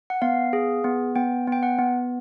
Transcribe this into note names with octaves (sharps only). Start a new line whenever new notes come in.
F#5
B3 F5
G#4
B3
B3 G5
B3
G5
F#5
B3